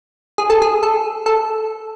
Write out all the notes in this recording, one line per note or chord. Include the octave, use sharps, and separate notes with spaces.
G#4
A4
G#4
A4
A4